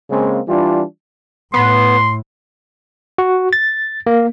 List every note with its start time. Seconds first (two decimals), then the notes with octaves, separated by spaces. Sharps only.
0.10 C#3 G#3 A#3 C4
0.48 E3 G3 D4 F4
1.54 A2 B3 C6
3.18 F#4
3.53 A6
4.07 A#3